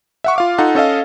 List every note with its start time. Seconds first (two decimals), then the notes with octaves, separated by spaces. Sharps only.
0.24 E5 F#5 C#6
0.36 F4 F5 D6
0.58 D#4 F4 A4 F#5
0.75 C#4 A4 D#5 F5